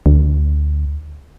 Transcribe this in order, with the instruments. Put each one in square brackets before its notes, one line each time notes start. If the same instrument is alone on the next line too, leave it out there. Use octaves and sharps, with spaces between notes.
[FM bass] D2